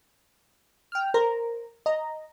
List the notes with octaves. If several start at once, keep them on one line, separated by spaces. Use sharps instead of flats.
G5 F6
A#4 C5 A#5
D#5 A#5